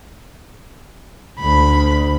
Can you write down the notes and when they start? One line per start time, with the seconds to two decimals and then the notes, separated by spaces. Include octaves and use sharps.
1.40 D2 B5